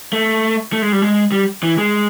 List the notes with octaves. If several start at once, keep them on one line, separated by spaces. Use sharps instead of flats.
A3
A3
G#3
G3
G#3
G3
E3
G#3